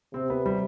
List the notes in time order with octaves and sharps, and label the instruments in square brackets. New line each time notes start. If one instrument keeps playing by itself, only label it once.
[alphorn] C3 [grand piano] C4
[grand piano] B3
G3